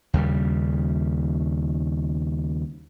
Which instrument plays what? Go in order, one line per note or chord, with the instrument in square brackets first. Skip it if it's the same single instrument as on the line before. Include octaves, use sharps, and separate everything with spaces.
[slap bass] D#2 C#3 G3